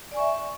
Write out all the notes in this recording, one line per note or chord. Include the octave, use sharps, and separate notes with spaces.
D5 E5 G#5 C#6